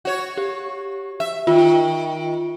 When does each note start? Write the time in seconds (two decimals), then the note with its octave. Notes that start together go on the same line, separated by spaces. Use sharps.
0.05 F#4 C#5
0.37 G4
1.20 E5
1.47 D#3 F4